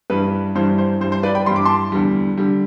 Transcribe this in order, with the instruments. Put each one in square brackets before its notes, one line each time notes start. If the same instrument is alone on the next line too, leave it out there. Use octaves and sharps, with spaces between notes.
[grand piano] G2 E3 G3 B4
G2 E3 G3 C5
C5
G2 E3 G3 C5
C5
B4 D5
G5 B5
G2 E3 G3 C6
D6
A5 C6
E2 D3 G3
D3 G3